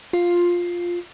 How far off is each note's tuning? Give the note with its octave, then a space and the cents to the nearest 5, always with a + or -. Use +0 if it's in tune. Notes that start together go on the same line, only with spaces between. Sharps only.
F4 +5